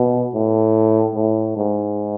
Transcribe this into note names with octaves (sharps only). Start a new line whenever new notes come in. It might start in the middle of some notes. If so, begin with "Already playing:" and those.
Already playing: B2
A2
A2
G#2